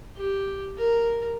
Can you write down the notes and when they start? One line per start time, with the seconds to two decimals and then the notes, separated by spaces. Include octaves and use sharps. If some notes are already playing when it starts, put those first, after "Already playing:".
0.17 G4
0.77 A#4